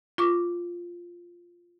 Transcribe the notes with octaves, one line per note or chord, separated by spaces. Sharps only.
F4 C#6 D6